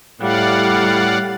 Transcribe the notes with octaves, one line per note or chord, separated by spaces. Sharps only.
A2 G3 D5 F5 F#5